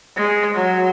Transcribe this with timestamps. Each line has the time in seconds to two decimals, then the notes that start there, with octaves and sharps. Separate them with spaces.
0.16 G#3
0.55 F#3